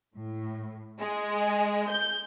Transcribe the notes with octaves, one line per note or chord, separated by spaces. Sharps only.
A2
G#3
G6